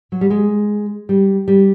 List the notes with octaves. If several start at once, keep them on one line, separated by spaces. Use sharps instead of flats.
F#3
G3
G#3
G3
G3